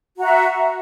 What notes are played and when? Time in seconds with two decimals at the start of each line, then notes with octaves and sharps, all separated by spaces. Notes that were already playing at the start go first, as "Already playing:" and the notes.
0.17 F#4
0.19 A#5
0.22 E5